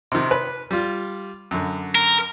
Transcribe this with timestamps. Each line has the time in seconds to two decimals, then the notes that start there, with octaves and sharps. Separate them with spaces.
0.12 C3 D#3
0.31 B4
0.71 G3 F4
1.51 F#2 D3
1.95 A#4